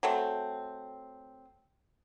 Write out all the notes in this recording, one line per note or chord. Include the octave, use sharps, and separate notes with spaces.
F#3 A3 C4